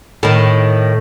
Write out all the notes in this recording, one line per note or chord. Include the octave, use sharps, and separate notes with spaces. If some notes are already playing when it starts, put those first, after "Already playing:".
A2 D#3